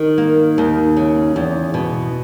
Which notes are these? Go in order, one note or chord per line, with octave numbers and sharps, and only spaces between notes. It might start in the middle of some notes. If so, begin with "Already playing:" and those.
Already playing: D#3
A#3
D#2
C#3
E2
B2